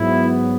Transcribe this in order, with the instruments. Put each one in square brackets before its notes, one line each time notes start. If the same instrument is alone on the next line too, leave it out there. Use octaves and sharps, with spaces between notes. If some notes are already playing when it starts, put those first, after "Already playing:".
Already playing: [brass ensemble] G#2 F#3 B3 E4